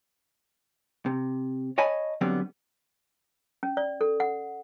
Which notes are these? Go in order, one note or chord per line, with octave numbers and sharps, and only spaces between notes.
C3
C#5 D#5 G#5 A5 B5
D3 F#3 G3 B3 C4
C#4
D5
A4
F#5